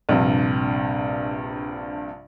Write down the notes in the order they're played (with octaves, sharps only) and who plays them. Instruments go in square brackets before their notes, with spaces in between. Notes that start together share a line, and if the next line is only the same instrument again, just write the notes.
[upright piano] A#1 G2 C3